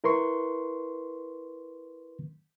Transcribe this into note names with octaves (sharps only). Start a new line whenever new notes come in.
E4 A#4 B4 C6 C#6